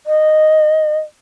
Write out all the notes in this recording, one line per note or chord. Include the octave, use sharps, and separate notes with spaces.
D#5